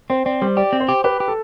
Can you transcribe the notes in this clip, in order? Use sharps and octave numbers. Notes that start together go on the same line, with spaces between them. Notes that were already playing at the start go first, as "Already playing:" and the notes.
C4 C5
C4 D5
G3 C5
G4 D5
C4
C5
G4
G4 B4
G4
A4